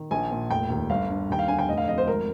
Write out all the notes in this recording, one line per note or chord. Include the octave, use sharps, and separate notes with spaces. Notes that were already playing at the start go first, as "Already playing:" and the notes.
Already playing: D#3
A#1 G#5
A#2
F1 G5
D#2
G1 F5
G2
D#2 G5
F5
D3 G#5
G5
F1 D#5
F5
F2 D#5
C5
G#1 A#4